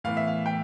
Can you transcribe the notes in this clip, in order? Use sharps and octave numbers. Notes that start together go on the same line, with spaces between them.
A2 E3 B3 F5
E5
F5
G5